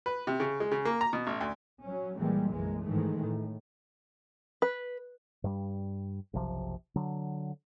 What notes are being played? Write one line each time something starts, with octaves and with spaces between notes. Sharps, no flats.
B4
C3
C#3
G#3
C#3
A#3
A#5
B2
A1
D2
F#3 C#4
A#1 E3 G3 G#3 A#3
F#1 B1 E3 G#3 A#3
G#2 D#3 E3 G#3 A3
A2
B4
G2 G3
F#1 B1 C3 F3
D3 F#3